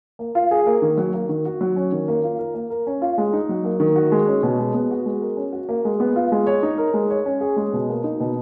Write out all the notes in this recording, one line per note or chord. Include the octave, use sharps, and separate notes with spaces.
A#3
F4
G#4
A#3
D#3
F#3
A#3
D#3
F#4
F#3
C#4
D#3
A#3
F4
A#4
A#3
A#4
C#4
F4
G#3
D#4
F#3
A#3
D#3
F#4
G#3
C#4
B2
G#3
B3
F#4
G#3
A#4
C#4
F#4
A#3
G#3
B3
F4
G#3
C#5
D#4
A#4
G#3
C#5
C#4
G#4
G#3
B2
A#3
D#4
B2